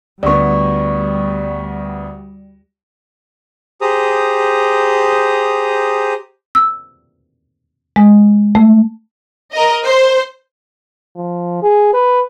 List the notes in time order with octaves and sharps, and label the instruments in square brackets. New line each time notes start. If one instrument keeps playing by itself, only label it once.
[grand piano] D2 B3 [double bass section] G3 [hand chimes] D5 C#6
[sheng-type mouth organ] G4 G#4 C5 A#5 D#6
[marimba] E6
G#3
A3
[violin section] A#4 D#5
C5
[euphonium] F3
G#4
B4